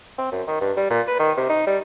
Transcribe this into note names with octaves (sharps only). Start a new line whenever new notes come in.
C4
F#2
D#3
G2
G3
A#2
B4
D#3
C3
D#4
G3